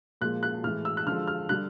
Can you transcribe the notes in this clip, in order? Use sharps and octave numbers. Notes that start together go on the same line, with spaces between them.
A#2 F3 G#3 F#6
F#6
A2 E3 G#3 F6
E6
F#6
D3 F3 G#3 F6
F6
D3 G3 F#6